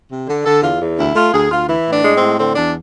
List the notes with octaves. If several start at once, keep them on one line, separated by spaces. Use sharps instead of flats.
C3
D3
D3 A4
E2 F4
E2
D2 E4
A3 F4
D2 G#4
D2 F4
E3 E4
A2
D4
G#3
C4
A2
D3 C4
E2 D4